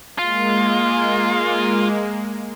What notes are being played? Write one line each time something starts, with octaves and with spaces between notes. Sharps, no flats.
G#3 A#3 F4